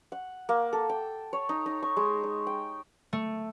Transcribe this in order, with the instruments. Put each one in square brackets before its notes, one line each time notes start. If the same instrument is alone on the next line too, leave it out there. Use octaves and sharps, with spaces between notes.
[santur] F#5
A#3
A4
G5
C#5
D#4
D#4
C#6
G#3
D#5
G5
[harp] A3